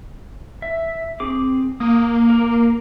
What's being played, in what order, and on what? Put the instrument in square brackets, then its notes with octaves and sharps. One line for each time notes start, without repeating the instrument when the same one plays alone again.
[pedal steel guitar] E5
C4 G#4 D6
[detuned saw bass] A#3 [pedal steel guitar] D#6
[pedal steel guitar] A#4